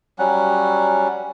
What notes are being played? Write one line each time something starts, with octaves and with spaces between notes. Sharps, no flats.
F#3 G3 C#4 F#5